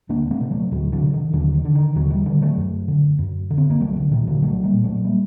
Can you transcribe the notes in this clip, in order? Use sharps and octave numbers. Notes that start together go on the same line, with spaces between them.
D2 A#3 D4
A#3
A3 C4
C3
F#3 A3
D2 D3 F#3
D3 F#3
C3
D#3
D#2 D3 F#3
D#3
D3
D#3
D#2 D3 F#3
D#3 G3
D3 D#3 G3
F#3 A3
F#2
D3
F#2
D3
C4
A#3
C2 F#3 A3
D3
A#2 D#3
D3 F#3
C2 F#3 A3
G3 A#3
A#2
F#3 A3
G3 A#3